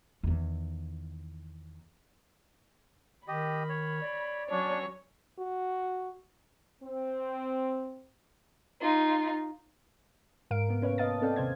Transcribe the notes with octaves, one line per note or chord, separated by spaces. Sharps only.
E2 D#3
D#3 G4 D#5 B5
C#5
D5
F#3 C#4 D4 C#5
F#4
C4
D#4 F4
G#2 A#4 F5 D7
C3 A#3 B3
C#4 B4 C#5 F5
B4 D#5 F5 A5 D#6 A6
C4 A4 D5 F5 G5
D#2 C3 C#4 C5 F5 G#6